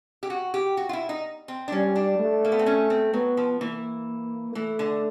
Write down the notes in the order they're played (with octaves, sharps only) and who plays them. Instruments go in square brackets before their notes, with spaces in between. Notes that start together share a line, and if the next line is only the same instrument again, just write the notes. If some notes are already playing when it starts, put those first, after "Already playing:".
[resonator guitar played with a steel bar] G4
F#4
G4
F#4
F4
E4
D#4
C4
D4
[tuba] G3 [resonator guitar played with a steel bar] C#4
[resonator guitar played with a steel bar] D4
[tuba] A3
[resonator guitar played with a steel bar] A#3
B3
C4
C#4
C4
[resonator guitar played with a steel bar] F#3 [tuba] B3
[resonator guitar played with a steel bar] F3
[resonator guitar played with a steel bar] E3 [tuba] A#3
[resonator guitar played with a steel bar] E3 [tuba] A3
[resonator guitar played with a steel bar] D3